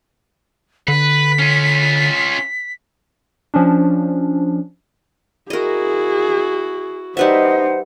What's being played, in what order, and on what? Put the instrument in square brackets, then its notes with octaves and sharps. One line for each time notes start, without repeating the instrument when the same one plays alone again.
[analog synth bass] D3 [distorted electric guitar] B4 [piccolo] B6
[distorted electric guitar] C#4 F4
[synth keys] F3 C#4 D4
[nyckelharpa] E4 F#4 [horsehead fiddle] G#4 [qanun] A#4 D#5
[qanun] G3 B4 E5 [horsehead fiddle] D#4 D#5 [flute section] C5 F#5